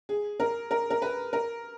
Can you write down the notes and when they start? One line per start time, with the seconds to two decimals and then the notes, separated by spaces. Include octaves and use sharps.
0.09 G#4
0.40 A#4
0.71 A#4
0.90 A#4
1.02 B4
1.33 A#4